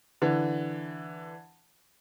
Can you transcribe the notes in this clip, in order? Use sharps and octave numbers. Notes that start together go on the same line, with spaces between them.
D3 E3